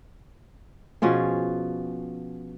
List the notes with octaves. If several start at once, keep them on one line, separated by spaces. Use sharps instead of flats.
B2 F3 C#4 G#4